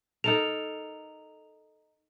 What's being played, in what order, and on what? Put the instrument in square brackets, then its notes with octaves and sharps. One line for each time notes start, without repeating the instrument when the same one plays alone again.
[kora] D#4 A4 A#4 [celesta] F7